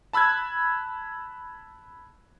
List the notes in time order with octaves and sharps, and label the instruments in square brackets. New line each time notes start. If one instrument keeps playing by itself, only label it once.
[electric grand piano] A5 B5 E6 F#6 G#6